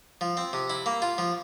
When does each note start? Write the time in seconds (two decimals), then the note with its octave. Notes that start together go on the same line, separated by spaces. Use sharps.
0.21 F3
0.37 C4
0.53 C3
0.70 E4
0.86 A#3
1.02 F4
1.18 F3